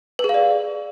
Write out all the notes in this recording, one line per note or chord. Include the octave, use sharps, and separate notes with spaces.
B4
G#4
F5
D5